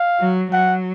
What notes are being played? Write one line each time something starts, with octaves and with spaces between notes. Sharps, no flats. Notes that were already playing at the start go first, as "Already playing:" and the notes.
Already playing: F5
F#3
F#3 F#5